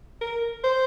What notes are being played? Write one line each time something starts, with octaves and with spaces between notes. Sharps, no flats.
A#4
C5